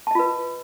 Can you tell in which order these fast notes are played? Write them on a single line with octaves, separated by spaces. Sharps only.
A5 D#5 F4 B4